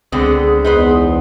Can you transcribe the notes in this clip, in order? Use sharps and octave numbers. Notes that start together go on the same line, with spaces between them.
C#2 D3 B3 C4 G#4
E2 D#4 B4 C5